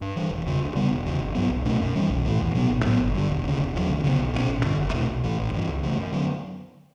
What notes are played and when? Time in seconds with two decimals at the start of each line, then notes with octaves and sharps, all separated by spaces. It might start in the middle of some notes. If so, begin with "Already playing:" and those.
0.01 G2
0.16 E3 G3
0.31 E1
0.46 E2 C#3
0.61 D2
0.75 C#3 G3 B3
0.91 E1
1.06 E2 C#3
1.20 G1
1.35 G2 F#3 B3
1.50 B1
1.65 B2 A3 C#4
1.81 F#2
1.95 E3 G3 C#4
2.10 B1
2.25 A2 E3
2.40 E2
2.55 B2 F#3 B3
2.70 A1
2.85 A2 F#3 B3
3.00 G1
3.14 G2 D3
3.30 E1
3.44 D2 C#3
3.59 E1
3.74 E2 C#3 F#3
3.89 D2
4.04 C#3 E3 B3
4.18 B1
4.34 B2 F#3 C#4
4.49 A1
4.63 G2 D3
4.79 F#1
4.94 E2 B2 A3
5.08 B1
5.23 A2 E3
5.38 A1
5.53 G2 E3
5.68 C#2
5.83 C#3 E3 A3
5.97 F#2
6.12 D3 F#3 B3